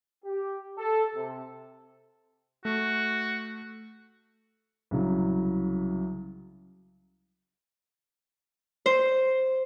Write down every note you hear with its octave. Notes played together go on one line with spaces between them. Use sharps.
G4
A4
C3
A3 F#4
C2 C#3 F#3
C5